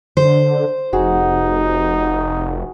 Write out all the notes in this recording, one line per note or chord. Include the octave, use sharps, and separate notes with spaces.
D3 C5
F1 D#4 F#4 G#4